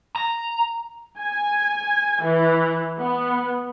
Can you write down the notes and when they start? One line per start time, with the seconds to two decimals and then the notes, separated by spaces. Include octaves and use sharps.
0.16 A#5
1.18 G#5
2.22 E3
2.98 B3